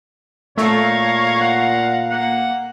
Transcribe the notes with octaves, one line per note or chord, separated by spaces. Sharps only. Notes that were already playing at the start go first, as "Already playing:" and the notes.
A#2 A3 C#5 F5 A#5
F#5
A#3 F#5